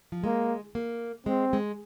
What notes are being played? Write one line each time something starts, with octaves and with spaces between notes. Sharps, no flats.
F3
G#3 A#3
A#3
G#3 C4
G#3